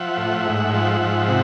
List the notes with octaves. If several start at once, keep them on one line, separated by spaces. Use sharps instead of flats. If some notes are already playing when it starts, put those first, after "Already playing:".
Already playing: F3 E5 F#5
A2
G#2
F3
G#2
C3